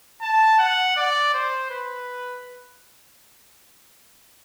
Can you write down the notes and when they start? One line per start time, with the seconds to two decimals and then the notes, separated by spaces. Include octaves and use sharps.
0.21 A5
0.59 F#5
0.97 D5
1.34 C5
1.70 B4